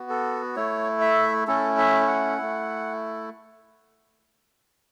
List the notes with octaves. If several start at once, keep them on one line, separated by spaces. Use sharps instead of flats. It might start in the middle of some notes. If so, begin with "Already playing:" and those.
Already playing: B3 F#4
A4
A3 E4 C#5
E5
A3 C#4 E4 A4
E5
F#5
A3 E4